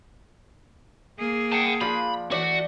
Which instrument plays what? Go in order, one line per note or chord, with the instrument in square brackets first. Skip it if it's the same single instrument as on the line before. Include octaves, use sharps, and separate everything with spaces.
[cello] A#3 G#4
[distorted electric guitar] F#5 A5 [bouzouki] G5
[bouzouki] F3 D4 [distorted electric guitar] B5
[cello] E3 [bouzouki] A3 D5 [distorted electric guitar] F#4 F#5